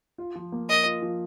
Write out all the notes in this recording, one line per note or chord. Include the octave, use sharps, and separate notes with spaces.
F4
F3
A#3
A#4 D#5
F4
F3